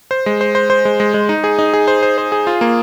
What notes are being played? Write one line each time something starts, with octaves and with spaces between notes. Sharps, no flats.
C5
G#3
C5
C5
C5
G#3
G#3
G#3
D#4
G#4
D#4
G#4
C5
C5
C5
G#4
F4
A#3